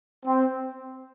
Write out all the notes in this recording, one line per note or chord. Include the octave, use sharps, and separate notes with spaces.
C4